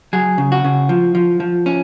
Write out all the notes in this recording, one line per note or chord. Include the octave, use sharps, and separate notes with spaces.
F#3 G#4
C#3
F#4
C#3
F3
F3
F3
C#4